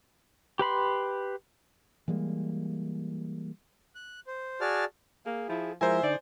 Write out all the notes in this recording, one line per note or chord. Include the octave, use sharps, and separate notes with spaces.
G4 B4 B5 C6
E3 G3 G#3 A#3
F#6
C5
F#4 G#4 D5 A5 F6
A#3 G#4
F3 E4
F3 G#3 E4 A#4 C5 E5 G#5
D3 D#4 D5